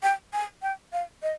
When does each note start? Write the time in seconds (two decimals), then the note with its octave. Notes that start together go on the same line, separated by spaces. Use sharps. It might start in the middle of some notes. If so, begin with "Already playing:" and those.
0.03 G5
0.33 G#5
0.62 G5
0.93 F5
1.23 D#5